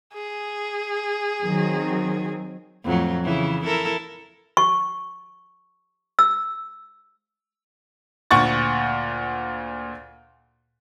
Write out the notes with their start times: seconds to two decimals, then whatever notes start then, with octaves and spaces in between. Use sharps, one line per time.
0.14 G#4
1.45 D#3 F#3 C4
2.84 F2 A2 F#3
3.23 C#3 E3 E4
3.64 E4 A4 A#4
4.57 C#6
6.19 E6
8.31 D2 A#2 F#5 C#6 A6